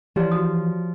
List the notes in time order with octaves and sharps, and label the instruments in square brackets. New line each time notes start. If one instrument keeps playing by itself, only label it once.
[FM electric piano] E3 [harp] F3 [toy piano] G4 C#5 D5
[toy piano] F#4 D#6